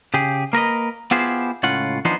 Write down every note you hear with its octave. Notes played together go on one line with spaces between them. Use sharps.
C#3 G4 G#4
A#3 A#4 B4 D#5
B3 E4 F4 G4 G#4 C5
C#2 A2 C#4 F4 F#5
E3 F3 B3 D4 D#4 C5